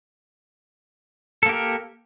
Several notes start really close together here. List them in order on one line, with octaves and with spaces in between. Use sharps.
A4 A#3 G4 A#4